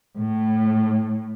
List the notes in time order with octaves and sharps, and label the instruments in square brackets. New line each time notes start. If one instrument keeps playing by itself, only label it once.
[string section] A2